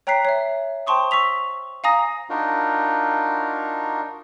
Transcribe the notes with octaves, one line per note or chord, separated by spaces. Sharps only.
C#5 G5 A#5 F#6 B6 C7
C#5 E5
C5 G5 A5 C6 C#6 D#6
C#6 E6 B6 F7
F5 G#5 A#5 D#6 A#6
D4 D#4 F4 F#4 A#4